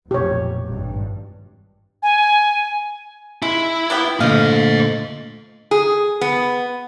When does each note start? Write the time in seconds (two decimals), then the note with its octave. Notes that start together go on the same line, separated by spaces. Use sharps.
0.11 F1 B1 A#2 G4 C#5
0.67 G#1 G2
2.03 G#5
3.42 G#3 E4
3.90 A#3 B3 G4
4.20 A#2 D3 A3 C5 D#5 F5
5.71 G#4
6.21 B3